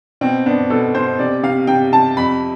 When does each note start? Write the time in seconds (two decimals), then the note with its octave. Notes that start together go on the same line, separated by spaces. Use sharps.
0.21 B2 C4
0.46 B3 D4
0.70 B2 A4
0.95 B2 C5
1.19 C3 D5
1.43 C3 F5
1.67 C3 G5
1.92 C3 A5
2.17 F2 B5